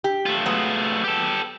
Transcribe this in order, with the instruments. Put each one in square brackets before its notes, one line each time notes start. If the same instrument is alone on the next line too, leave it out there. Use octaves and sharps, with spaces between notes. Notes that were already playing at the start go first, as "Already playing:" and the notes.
[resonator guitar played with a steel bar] G4
[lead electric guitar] A3 F4
[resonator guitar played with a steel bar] F#3 G#3 B3
[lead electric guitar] G4 A4